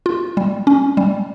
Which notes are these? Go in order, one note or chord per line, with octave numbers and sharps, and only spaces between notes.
F4
G3
C#4
G3